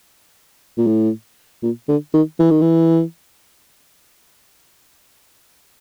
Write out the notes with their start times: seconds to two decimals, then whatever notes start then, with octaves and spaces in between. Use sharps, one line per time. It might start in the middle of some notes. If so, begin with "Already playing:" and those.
0.78 A#2
0.87 A2
1.63 A#2
1.89 D3
2.14 D#3
2.40 E3
2.51 D#3
2.61 E3